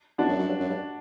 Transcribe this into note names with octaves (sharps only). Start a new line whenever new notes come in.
E2 D4 F#4
F#2
F#2
G2
F#2
G2